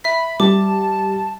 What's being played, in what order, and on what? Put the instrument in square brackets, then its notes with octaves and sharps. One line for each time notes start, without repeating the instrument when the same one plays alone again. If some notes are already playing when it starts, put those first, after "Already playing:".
[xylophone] E5 B6 [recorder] B5
[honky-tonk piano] G3 [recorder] A5 [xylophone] D6